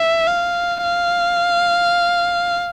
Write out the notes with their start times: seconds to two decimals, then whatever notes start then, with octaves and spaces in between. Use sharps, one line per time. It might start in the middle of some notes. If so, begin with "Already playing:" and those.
Already playing: E5
0.27 F5
0.84 F5